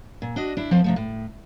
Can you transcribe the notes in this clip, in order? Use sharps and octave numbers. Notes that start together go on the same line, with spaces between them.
A#2
D4 F#4 D#5
D4 E4
F3 C4 A4 C5
C3 F3 A3
A2